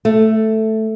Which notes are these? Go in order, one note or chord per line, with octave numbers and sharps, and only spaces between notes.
A3